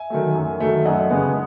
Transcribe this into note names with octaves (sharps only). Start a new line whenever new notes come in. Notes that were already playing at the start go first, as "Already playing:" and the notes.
Already playing: E5 G#5
D#3 F#3 A3
F#2
D#3 F#3 A3
F#2 D#5 F#5
C#3 G#3 B3